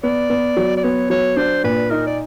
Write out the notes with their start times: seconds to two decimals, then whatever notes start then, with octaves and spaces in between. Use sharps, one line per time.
0.03 B3 D5
0.30 B3
0.57 F#3
0.77 D5
0.84 B3 C#5
1.10 F#3 C#5
1.37 D4 C5
1.64 A#2 B4
1.90 D#4 A#4
2.07 D5